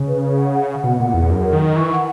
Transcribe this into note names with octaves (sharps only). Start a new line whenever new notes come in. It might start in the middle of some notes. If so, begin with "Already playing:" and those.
Already playing: C#3
B4
B4
F#5
F#5
F#5
B2 F#5
A#2 F#5
E2 G#4
F#2 A#4
A#4
D#3
A#4
E3 C#6
F#5